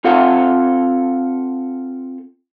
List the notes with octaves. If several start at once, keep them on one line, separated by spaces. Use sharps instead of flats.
C4 F4 A4 F5 F#5